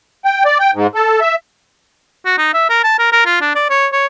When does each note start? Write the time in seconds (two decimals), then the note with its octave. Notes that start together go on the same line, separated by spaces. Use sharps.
0.25 G5
0.45 D5
0.60 G5
0.74 G#2
0.95 A4
1.21 E5
2.25 F#4
2.38 D#4
2.54 E5
2.70 A#4
2.84 A5
2.99 A#4
3.12 A#4
3.26 F4
3.41 D4
3.55 D5
3.70 C#5
3.93 C#5